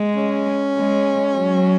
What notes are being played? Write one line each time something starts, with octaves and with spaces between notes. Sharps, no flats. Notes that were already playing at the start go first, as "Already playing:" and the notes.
Already playing: G#3
C#4
G#3
F#3